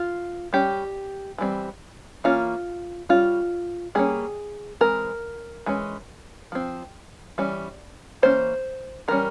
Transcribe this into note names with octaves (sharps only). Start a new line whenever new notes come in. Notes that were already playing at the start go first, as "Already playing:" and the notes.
Already playing: F4
G3 C#4 G4
E3 G3 C4
E3 A#3 C#4 F4
G3 C#4 F4
G3 A#3 C#4 G#4
E3 G#3 C4 A#4
E3 G#3 C#4
F3 C4
E3 G3 C#4
E3 A#3 C#4 C5
E3 G3 C#4 A#4